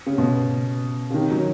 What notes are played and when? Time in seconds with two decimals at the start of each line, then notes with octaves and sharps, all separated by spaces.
0.06 C#3
0.18 B2
1.10 C#3
1.14 D#3
1.31 F#3